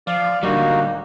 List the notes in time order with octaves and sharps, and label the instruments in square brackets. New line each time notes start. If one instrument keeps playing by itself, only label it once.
[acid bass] F3 [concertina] D5 F5
[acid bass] D1 [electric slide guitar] D3 G3 [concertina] A#3 D#4 F#4